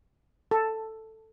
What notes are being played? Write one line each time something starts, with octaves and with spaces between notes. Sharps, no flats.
A4